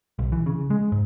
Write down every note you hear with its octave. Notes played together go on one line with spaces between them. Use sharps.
B1
E3
C#3
G#3
G#2